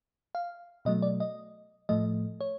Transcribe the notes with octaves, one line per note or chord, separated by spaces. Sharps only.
F5
B2 F#3 A3 D#5
D5
D#5
A2 F3 A3 D#5
C#5